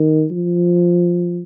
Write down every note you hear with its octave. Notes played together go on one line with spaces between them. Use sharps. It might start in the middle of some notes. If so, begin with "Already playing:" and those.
Already playing: D#3
F3